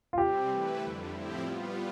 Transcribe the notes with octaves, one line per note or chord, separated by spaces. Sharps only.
F4
C3 G3 C4 G4
E3 A3 E4 B4
F2 D3 G3
A2 F3 C4 E4 G4
G3 B3 F4